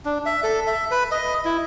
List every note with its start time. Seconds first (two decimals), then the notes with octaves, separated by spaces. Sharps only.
0.05 D4
0.26 E5
0.44 A4
0.67 E5
0.91 B4
1.11 D#5
1.45 E4